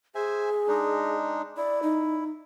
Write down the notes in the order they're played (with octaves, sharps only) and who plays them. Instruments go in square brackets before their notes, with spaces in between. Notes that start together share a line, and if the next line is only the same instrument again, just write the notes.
[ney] G#4 [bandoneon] C5 E5 G#5
[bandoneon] G#3 D4 D#4
[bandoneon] E4 [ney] D5
[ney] D#4